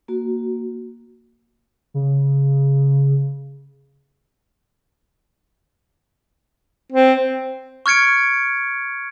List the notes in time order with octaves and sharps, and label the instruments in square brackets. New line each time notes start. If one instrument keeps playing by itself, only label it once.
[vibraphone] A#3 F#4
[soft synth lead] C#3
[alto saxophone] C4
[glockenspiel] C#6 F6 G#6 C#7 D7